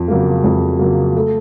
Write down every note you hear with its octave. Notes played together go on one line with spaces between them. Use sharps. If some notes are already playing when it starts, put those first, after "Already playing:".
Already playing: F2
C#3 F#3 A#3
F2
C#3 F#3 A#3
A3